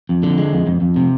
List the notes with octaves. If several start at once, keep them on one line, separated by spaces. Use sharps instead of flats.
F2
D3
G#3
F2
F2
F2
C3